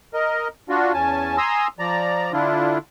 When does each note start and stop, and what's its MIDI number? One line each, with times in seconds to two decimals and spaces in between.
0.14 0.48 70
0.14 0.48 75
0.69 0.93 62
0.69 0.93 65
0.69 0.93 66
0.94 1.37 40
0.94 1.37 61
0.94 1.37 80
0.94 1.37 81
1.38 1.67 80
1.38 1.67 82
1.38 1.67 84
1.38 1.67 87
1.38 1.67 88
1.79 2.32 53
1.79 2.32 74
1.79 2.32 82
2.33 2.78 50
2.33 2.78 62
2.33 2.78 64
2.33 2.78 65